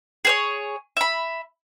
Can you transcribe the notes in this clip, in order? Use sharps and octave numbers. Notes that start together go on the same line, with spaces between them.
G#4 C5 C#5
E5 B5